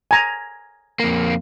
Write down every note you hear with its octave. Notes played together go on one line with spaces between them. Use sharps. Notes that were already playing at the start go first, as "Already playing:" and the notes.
G#5 A#5
F2 A#3